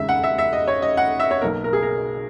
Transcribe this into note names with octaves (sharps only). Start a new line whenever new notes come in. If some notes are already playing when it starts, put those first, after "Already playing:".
Already playing: E1 D#2 C#3 G#3 E5
F#5
E5
E5
D#5
C#5
D#5
F#5
E5
C#5
B1 B2 A#3 A#4
A#4
G#4
A#4